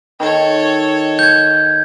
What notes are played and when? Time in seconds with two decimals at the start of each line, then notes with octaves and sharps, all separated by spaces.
0.20 D#3 A4 C#5
1.19 G6 G#6